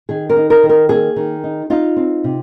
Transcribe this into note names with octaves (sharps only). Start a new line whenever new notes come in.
D#3 G#4
A#4
D#4
A#4
D#3
A#4
A#3 G#4
D#3
D#4
D#4 F4
C4
C3